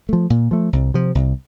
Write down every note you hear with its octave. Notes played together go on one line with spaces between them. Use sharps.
F3 A3
A#2
F3 A3
C2
C3 F3
C2